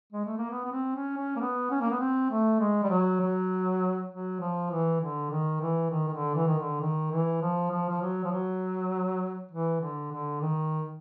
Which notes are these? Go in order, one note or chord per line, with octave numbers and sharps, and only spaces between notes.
G#3
A3
A#3
B3
B3
C4
C#4
C#4
A#3
B3
C#4
A#3
B3
C4
A3
G#3
G3
F#3
F#3
F#3
F3
E3
D3
D#3
E3
D#3
D#3
D3
E3
D#3
D3
D#3
E3
F3
F3
F3
F#3
F3
F#3
E3
D3
D3
D#3